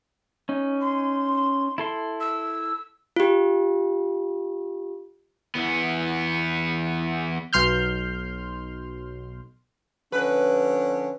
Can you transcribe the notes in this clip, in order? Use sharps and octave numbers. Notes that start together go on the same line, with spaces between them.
C#4 D#4
C6
E4 A4 C6
E6
F4 G4
E2 B3
B1 C6 F6 G6
D3 F3 C#4 B4